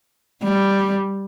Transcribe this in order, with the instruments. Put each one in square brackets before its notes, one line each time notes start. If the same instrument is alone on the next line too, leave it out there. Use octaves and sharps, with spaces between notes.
[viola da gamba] G3